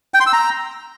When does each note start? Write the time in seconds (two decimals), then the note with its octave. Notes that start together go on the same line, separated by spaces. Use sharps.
0.14 G5
0.20 C6
0.27 E6
0.33 A#5